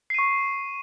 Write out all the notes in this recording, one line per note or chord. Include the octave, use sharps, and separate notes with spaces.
C#6 C7 D#7